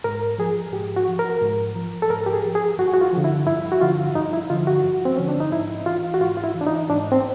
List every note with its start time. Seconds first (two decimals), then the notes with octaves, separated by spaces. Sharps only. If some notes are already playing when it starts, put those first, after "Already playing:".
0.04 G#2 A#4
0.38 F3 G#4
0.73 G#2 G4
0.96 F#4
1.08 F3
1.19 A#4
1.42 G#2
1.75 F3
2.02 A4
2.10 G#2 A#4
2.26 G4
2.33 G#4
2.45 F3
2.55 G#4
2.78 G2 F#4
2.94 F#4
3.01 F4
3.13 D3 F3
3.24 E4
3.47 G2 E4
3.72 F#4
3.81 D3 F3 F4
4.15 G2 D#4
4.33 E4
4.50 D3 F3 F4
4.67 F#4
4.84 G2
5.05 C4
5.17 D3 F3 C#4
5.29 D4
5.40 D#4
5.52 G#2 E4
5.86 E3 F4
6.14 F#4
6.20 G#2 F4
6.37 F4
6.44 E4
6.55 E3
6.61 D4
6.66 D#4
6.89 G#2 D4
7.12 C4